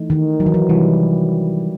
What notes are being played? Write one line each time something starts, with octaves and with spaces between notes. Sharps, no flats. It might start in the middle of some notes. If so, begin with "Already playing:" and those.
Already playing: E3 A3 D#4
D#3
F#3
E3
F#3
C3 E3 G3